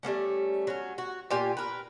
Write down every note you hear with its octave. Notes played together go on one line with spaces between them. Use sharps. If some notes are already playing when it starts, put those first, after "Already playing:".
G3 A3 A#3 C#4
F#3 C#4
F#4
A#2 F4 G4 G#5
A#4 B4